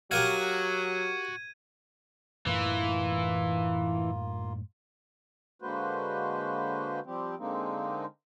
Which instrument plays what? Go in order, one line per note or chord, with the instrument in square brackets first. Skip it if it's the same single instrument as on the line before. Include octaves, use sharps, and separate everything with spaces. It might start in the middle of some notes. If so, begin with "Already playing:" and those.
[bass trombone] F#3 [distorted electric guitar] F#4 [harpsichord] G4 A#4 F5 [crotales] G#6 D#7
[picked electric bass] F#2 A2 A3 [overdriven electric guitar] E3 [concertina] A#3 F4
[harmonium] D3 G#3 A#3 F#4 B4 C5
F3 G3 C4 G4
D3 G#3 A#3 C4 D#4